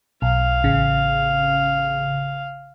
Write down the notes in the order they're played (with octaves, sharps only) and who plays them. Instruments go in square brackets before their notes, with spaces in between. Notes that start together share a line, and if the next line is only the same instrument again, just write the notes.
[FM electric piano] B1 [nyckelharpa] F5
[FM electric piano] A1 C#3